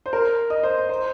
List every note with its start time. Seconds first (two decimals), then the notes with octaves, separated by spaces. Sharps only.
0.06 C5
0.13 A#4
0.50 D#5
0.63 C5
0.89 C5